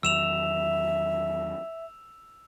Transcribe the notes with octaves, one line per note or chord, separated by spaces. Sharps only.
E2 D#3 F#3 E5 E6 E7 F7